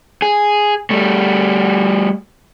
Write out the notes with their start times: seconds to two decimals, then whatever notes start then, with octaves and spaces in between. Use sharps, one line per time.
0.22 G#4
0.90 G3 A3